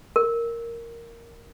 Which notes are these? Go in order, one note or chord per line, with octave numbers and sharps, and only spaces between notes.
A#4